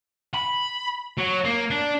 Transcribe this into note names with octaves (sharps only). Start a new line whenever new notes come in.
B5
F#3
A#3
D4